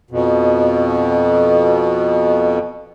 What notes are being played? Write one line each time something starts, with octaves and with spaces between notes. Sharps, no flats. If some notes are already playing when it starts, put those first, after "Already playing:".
F2 B2